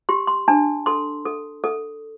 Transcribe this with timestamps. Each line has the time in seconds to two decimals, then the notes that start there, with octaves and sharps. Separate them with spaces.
0.09 G4 C6
0.27 C6
0.48 D4 A5
0.86 A4 C6
1.25 A4
1.64 A4